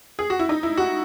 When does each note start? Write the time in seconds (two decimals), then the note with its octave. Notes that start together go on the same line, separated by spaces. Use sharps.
0.19 G#4
0.30 F#4
0.39 E4
0.49 D#4
0.63 E4
0.77 F#4